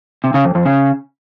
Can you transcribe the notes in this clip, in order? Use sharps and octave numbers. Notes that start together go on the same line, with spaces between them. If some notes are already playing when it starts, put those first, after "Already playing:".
C3
C#3
F2
F2
C#3